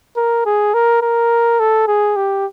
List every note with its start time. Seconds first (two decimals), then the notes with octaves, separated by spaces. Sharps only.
0.16 A#4
0.46 G#4
0.74 A#4
1.02 A#4
1.60 A4
1.88 G#4
2.16 G4